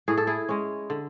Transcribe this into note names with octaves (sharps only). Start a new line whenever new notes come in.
A2 G#4
A4
E4 G#4
G#3 C#4
D3